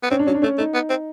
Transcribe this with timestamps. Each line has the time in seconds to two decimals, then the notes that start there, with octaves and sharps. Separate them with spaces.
0.03 B3
0.11 C4 C#4
0.19 D4
0.27 F#3 C#4
0.35 D4
0.42 A3 C#4
0.58 A3 D#4
0.74 B3
0.89 C4